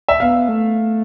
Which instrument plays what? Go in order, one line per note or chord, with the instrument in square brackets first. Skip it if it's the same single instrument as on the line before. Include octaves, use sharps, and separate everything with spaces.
[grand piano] E5
[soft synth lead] B3 [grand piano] F5
[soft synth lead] A3